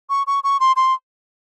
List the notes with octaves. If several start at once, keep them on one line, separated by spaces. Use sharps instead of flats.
C#6
C#6
C#6
C6
C6